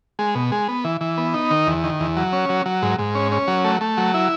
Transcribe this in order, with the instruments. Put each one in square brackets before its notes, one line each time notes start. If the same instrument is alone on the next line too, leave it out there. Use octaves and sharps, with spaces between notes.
[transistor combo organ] G#3
B2
G#3
B3
E3
E3
B3
D#4
D#3
E2
D#3
E2
F#3
C#4
F#3
F#3
G#2
G#2
C#4
C#4
F#3
A3
A3
F#3
E4